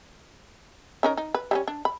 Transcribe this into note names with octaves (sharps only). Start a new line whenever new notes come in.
C#4 D#4 A#4
D#4
B4
G3 G#3 C#4
D4
B5